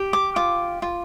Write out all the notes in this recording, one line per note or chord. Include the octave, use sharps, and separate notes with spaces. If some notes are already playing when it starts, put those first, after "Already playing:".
Already playing: G4
D6
F4 D6
F4